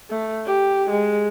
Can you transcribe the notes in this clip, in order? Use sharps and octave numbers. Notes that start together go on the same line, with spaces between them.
A3
G4
G#3